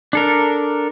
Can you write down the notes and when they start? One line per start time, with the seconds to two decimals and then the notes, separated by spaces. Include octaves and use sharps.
0.13 D4 A4 A#4